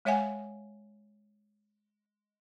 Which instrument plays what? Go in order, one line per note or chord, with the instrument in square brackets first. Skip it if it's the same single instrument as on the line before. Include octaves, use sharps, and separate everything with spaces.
[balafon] G#3 C#5 E5 F#5 G#5